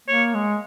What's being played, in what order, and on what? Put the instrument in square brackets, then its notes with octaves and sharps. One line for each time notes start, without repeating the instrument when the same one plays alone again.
[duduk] A#3 [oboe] C#5
[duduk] G#3